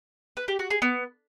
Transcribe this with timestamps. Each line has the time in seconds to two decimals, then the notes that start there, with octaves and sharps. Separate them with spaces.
0.37 B4
0.48 G4
0.59 F#4
0.71 G#4
0.82 B3